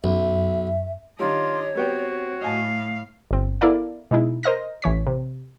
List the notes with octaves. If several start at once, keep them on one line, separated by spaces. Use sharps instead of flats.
B1 F#2 E5
D#3 G3 D4 F4 C#5 D#5
G3 B3 C4 F#4 G5
A2 D#5 F5 G#5 A5
G1 C4
B3 E4 A4 A#4 D5 F5
B2 G#3 D#4 E4
A#4 C5 D#5 F6 A#6
A1 E3 C#5 B6
C3